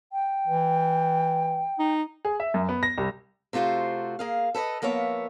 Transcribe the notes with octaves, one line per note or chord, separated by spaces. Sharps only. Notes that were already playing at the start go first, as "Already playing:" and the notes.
G5
E3
D#4
G#4
E5
F#2
B3
A#6
C2
C3 A3 F4 F#4 C5
A#3 G#4 F5
A4 B4 C#5 D#5
F3 A#3 B3 C#5 E5